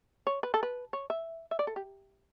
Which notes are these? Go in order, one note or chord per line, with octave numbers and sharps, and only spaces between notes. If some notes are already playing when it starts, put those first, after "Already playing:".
C#5
B4
A4
B4
C#5
E5
E5
D5
A4
G4